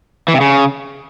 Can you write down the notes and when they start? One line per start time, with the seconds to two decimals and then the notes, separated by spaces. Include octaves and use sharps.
0.28 E3
0.34 C3
0.41 C#3